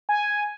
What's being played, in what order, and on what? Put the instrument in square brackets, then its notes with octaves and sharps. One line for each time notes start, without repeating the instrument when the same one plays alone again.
[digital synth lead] G#5